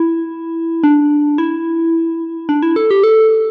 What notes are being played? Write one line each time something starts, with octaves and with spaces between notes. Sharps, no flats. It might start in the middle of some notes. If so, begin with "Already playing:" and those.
Already playing: E4
D4
E4
D4
E4
A4
G4
A4